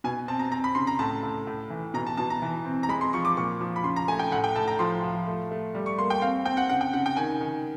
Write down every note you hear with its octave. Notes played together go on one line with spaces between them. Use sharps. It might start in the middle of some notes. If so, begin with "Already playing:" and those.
B2 G#5
C4 A5
A#5
C4 A#5
B5
C#3 C6
A#5
A2 A5
A2
A2
E3
B2 A#5
A5
B2 A5
A#5
E3
C4
A#5
G#3 B5
C6
F3 C#6
D6
A#2 C#6
F3
B5
C#3 C6
A#5
A3 G#5
G5
A2 F#5
G5
A2 A5
A#5
F3 C6
F3
A3
A3
G3
C#6
A#3 C6
G5
C4 F5
C4 G5
F#5
C#3 F#5
G5
C#3 F#5
G5
D#3 G#5
D#3